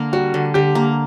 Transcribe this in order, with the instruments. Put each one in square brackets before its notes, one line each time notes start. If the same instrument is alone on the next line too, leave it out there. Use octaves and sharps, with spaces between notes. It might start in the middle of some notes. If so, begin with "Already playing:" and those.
Already playing: [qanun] D3 A#3
[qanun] G3 [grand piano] F#4
[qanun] D3
[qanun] D3 [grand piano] G4
[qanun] A#3